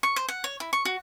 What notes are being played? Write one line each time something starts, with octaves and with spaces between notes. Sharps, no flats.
C#6
C5
F#5
C#5
E4
C#6
F#4